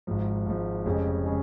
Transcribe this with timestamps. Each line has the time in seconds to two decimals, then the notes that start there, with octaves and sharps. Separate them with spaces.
0.07 G#1 G#2 F3
0.46 G#1 G#2 F3
0.85 F1 F2 C#3 G#3 C#4
1.26 C#3 G#3 C#4